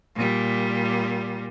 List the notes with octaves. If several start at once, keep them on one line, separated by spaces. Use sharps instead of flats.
A#2 G3